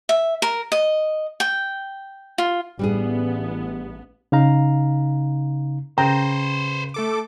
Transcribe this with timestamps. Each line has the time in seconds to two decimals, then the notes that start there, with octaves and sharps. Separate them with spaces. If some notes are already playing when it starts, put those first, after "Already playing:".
0.09 E5
0.42 A#4
0.72 D#5
1.40 G5
2.38 F4
2.79 A1 G3 B3 D4 G#4
4.32 C#3 D#4 F5 A#5
5.98 C#3 B4 C5 G5 A#5
6.94 A3 A4 D6